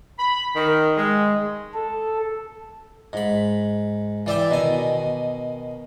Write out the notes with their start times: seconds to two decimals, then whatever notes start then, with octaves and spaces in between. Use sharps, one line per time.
0.19 B5
0.54 D#3
0.97 G#3
1.74 A4
3.13 G#2 B5
4.26 E3 D5 E5 G5
4.51 B2 D#3 G#5